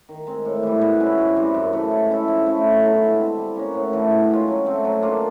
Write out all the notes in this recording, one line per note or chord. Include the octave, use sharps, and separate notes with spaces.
D#3
G#3 C4
A2
E3 G3
B2
G#3 C#4 E4
G#2
E3 G3 C4
F#2
C#3 E3 A3
G#3
C#4 E4 A4
F3
A3 C#4 E4
D3
F#3 B3 E4
G#3
C4 E4 A4
G3
A#3 C#4 F#4
A2
E3 A3 D4
B2
G#3 C#4 F4
F#3
A3 C4
F#3
A#3 D4 F4